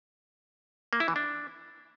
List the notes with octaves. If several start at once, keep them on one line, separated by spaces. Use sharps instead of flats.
A#3
E4
E3
D4